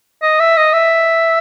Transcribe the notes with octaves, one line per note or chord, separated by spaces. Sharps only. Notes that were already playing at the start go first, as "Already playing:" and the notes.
D#5
E5
D#5
E5